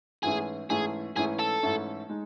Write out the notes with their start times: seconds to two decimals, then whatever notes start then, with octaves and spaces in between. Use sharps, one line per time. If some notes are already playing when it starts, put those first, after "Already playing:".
0.23 G#2 E3 A3 C#4 E4 G#4
0.70 G#2 E3 A3 C#4 E4 G#4
1.16 G#2 E3 A3 C#4 E4 G#4
1.39 A4
1.63 G#2 E3 A3 C#4 E4
2.09 G#3 D#4